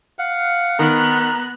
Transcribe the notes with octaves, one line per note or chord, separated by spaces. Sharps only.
F5 F#5
D#3 B3 A#5 F#6